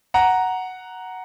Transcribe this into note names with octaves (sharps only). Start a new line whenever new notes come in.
F#5 A#5